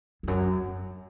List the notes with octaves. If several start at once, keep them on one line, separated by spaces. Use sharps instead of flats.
F2
F#2